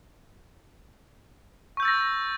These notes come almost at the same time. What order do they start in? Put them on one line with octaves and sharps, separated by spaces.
C#6 G6 E6 A6 A#6